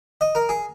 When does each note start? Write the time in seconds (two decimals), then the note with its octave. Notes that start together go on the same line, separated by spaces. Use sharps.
0.21 D#5
0.35 A#4
0.49 G#4